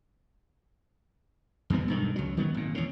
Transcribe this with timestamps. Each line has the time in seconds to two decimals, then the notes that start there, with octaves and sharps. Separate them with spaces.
1.70 E2 G#2 B2 B3
1.88 B1 G2 D#3
2.16 C#2 F#3
2.37 D#3 F#3 B3
2.54 G#1 A#2
2.75 E2 C#3